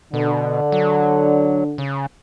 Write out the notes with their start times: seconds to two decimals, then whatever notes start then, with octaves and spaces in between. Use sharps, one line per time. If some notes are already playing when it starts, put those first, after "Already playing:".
0.13 B2 D3
0.72 F#3
1.78 C#3